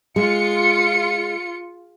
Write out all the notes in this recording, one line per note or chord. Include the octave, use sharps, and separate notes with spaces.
G#3 F4 C#7